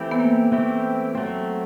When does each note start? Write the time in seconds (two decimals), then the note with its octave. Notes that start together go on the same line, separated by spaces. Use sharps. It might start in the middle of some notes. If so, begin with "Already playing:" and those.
Already playing: E3 A3 C4 E4 G4
0.11 B3
0.20 A#3
0.52 E3 A3 C4 E4 G4
1.15 F#3 A3 C4